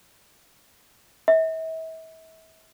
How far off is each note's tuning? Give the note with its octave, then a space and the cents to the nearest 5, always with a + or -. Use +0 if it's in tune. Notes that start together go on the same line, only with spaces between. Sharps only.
E5 -40